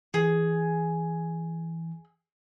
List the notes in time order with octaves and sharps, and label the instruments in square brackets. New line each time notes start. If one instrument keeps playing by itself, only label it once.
[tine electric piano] E3 [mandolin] G#4